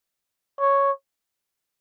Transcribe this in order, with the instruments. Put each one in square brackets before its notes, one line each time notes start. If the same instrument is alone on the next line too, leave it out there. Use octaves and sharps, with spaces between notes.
[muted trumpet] C#5